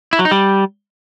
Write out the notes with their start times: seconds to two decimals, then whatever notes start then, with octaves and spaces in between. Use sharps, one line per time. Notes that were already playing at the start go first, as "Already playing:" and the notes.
0.13 E4
0.19 F#3
0.25 D#4
0.31 G3